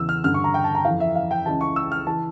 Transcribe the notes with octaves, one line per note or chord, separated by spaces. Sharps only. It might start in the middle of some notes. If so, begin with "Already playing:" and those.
Already playing: E2 C#3 E3 E6
F6
G2 D3 F6
C#6
A#5
G5
A5
A#5
F2 E3 F5
E5
F5
G5
C#2 C#3 E3 A5
C#6
E6
F6
E3 A5